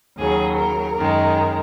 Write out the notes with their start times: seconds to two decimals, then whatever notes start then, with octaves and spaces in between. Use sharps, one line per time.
0.17 D#2 C#3 F#3 G#4
0.57 A#4
0.96 F#2 D#3 G#3